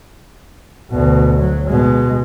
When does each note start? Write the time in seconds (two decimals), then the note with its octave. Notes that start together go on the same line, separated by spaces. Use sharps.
0.91 D2 B2
1.39 F#3
1.68 B2 G#3